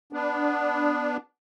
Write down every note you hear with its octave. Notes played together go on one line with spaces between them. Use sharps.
B3 D4